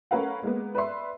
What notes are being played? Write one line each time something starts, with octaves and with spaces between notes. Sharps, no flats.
A3 C#4 A#4 B4 F5 F#5
G#3 A#3 B3
B4 D5 E5 C6